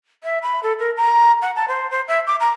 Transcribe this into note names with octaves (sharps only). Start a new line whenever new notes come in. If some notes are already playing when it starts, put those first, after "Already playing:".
E5
B5
A4
A#4
A#5
F#5
A5
C5
C5
E5
D6
A#5